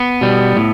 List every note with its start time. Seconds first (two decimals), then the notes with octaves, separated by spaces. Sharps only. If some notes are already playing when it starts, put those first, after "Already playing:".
Already playing: B3
0.21 B2 G3
0.56 A2